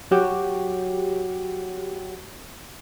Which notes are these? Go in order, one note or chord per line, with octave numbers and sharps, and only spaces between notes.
F#3 F#4 G4